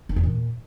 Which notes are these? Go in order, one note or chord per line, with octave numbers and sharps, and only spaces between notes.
D#3
E2
A#2